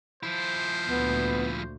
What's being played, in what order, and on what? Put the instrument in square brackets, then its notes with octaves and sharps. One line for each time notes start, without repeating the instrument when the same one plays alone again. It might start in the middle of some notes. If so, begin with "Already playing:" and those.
[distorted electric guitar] F3 E4 [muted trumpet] C5
[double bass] D2 A#2 [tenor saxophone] B3